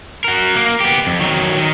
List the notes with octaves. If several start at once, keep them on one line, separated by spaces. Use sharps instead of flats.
F#4 A#4
A#3
B3 G4
F2
D#3 F#3
D#3